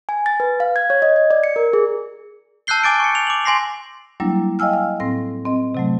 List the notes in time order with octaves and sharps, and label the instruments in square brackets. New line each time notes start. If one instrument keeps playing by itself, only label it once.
[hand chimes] G#5
A6
B4
F5
G#6
C#5
D#5
G#6
D5
C#7
A#4
G#4
[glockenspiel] A5 E6 F#6 G6 C7 G7
G#5 D6 A6 D7
C#6 C#7
F7
D6 F#7
G#5 C6 A#6 C7
[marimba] F#3 G3 A#3 D4 E4
D#5 F5 G5 G#5 E6 F6
F5
A2 C4 A#6
C4 D#5
C3 F#3 A3